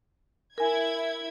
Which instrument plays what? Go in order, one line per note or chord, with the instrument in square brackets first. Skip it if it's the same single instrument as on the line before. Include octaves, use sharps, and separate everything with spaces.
[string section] E4 G#6 [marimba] A#4 G#5